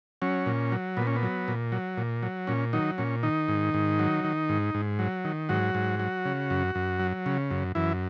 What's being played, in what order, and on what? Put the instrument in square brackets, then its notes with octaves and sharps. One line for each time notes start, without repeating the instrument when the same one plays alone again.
[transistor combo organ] F#3 C#4
A#2
F#3
A#2 B3
C#4
B3
F#3
A#2
F#3
A#2
F#3
A#2 C#4
D#3 F#3 D#4
A#2 C#4
D#3 D#4
G#2
G#2
F#3
D#3
G#2
G#2
F#3
D#3
G#2 F#3 F#4
G#2
F#3
C#3
F#2
F#2
F#3
C#3
F#2
F#2 E3 E4